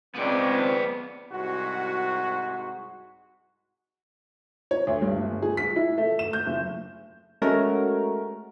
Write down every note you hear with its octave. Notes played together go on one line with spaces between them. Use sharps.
C#2 B3 C4 D5
C2 G#2 F#4
C#5
D2
G2
G1
G#4
B6
E4
A3
E7
G6
F#1
G#3 A3 C#4 F#4 A#4